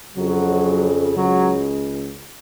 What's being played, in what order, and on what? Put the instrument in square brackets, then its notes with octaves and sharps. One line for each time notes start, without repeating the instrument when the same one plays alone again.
[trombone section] F2 C#3 F#3
C#2 C#3 F#3